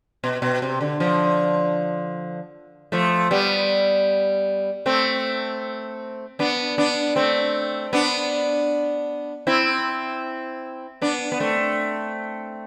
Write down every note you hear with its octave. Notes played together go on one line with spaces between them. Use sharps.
B2
B2
C3
D3
D3 F3
F3 A3
G3 B3
A3 C4
B3 D4
B3 D4
A3 C4
B3 D4
C4 E4
B3 D4
B3
A3 C4